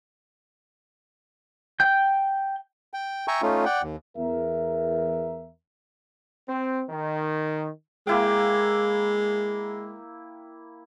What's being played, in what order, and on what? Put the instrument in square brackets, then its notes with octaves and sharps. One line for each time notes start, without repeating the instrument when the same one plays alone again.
[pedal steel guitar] G5 G6
[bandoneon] G5
E5 G5 G#5 A#5 C#6
A3 C#4 D#4 F4
D5 F#5 G5
D#2
[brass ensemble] E2 A#4 E5
[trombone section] C4
D#3
[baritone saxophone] G#3 [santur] A#3 E4 G5